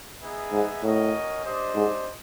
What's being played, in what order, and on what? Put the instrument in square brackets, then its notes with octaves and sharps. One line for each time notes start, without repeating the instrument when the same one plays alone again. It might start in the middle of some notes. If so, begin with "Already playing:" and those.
[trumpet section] B3 D#4 G#4 B4 E5
[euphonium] G#2
[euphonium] A2 [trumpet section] C#4 F#4 A#4 D#5
[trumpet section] D4 G4 C5 D#5
[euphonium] G#2